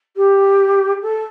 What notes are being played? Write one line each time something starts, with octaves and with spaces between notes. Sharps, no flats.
G4
A4